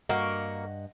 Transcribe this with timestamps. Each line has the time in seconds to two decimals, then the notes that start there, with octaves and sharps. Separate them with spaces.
0.09 G2 A#3 F#4 A#4 D#5 F#5